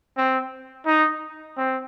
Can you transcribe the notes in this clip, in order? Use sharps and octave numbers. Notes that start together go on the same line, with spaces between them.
C4
D#4
C4